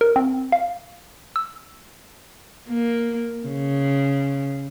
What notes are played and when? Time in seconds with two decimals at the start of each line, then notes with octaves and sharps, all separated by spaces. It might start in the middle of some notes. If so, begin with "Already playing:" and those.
0.01 A#4
0.16 C4
0.52 F5
1.36 E6
2.69 A#3
3.47 C#3